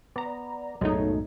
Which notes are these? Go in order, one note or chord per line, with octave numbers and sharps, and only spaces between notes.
B3 D5 A#5
B1 F#2 A2 F#3 G#3 A3 D#4